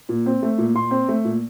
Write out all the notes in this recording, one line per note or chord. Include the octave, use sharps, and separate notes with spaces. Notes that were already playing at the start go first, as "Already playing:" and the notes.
A#2
C4
A3
A#2
A#2 C6
C4
A3
A#2